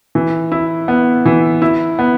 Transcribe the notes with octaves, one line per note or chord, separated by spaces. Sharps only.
E3
E4
B3
E3
E4
B3